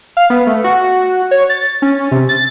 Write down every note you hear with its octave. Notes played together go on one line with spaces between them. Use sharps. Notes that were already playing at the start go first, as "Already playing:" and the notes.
F5
B3
A3
F#4
C#5
A6
C#4
C3
A6